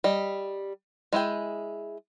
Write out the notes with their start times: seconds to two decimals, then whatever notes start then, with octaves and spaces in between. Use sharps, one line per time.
0.04 G3 D#5
1.13 G#3 E4 G#4 G5